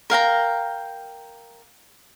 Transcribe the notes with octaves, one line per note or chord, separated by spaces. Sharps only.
A#4 F5 G5 A#5